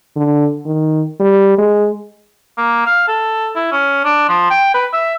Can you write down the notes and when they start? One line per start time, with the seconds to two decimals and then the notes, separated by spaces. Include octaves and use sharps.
0.16 D3
0.66 D#3
1.20 G3
1.58 G#3
2.58 A#3
2.86 F5
3.08 A4
3.55 E4
3.72 C#4
4.05 D4
4.29 F3
4.50 G5
4.74 B4
4.93 E5